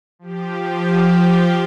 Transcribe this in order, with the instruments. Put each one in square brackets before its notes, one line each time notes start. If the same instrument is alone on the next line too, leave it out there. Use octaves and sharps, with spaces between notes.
[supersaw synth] F3 G4